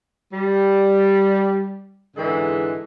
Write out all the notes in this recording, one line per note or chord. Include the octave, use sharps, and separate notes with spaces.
G3
G#2 D3 E3 G#3 A4